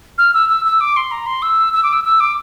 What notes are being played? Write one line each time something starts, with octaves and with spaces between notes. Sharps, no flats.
F6
E6
E6
E6
D6
C6
A#5
C6
E6
E6
D6
E6
E6
D6